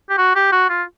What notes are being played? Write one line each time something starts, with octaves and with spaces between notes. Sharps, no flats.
G4
F#4
G4
F#4
F4